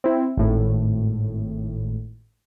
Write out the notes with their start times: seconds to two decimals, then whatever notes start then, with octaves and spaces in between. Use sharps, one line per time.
0.04 C4 E4
0.37 G#1 A2